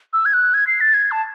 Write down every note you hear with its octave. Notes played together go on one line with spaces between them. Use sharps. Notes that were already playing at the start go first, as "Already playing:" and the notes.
E6
G#6
F#6
G#6
C7
A6
G#6
A5